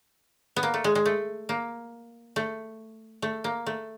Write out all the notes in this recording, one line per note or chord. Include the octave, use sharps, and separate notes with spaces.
B3
A#3
A3
G#3
G#3
A3
A#3
A3
A3
A#3
A3